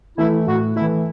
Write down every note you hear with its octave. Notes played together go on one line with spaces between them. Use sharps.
E3 A3 E4
A2 F#4
E3 A3 E4